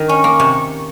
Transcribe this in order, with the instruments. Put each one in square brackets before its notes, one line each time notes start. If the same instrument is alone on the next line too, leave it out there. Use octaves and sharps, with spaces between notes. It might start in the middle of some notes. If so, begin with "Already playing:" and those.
Already playing: [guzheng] D#3
[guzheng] C#4 [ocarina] C#6
[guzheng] A#3
C3